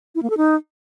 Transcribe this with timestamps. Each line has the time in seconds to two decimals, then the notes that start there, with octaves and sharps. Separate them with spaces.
0.15 E4
0.22 A#3
0.30 A4
0.37 D#4